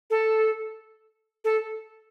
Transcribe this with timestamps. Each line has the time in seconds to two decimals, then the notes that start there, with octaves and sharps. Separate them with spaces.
0.10 A4
1.44 A4